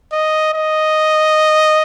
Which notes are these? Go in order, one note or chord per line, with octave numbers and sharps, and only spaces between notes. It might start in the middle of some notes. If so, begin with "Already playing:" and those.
D#5
D#5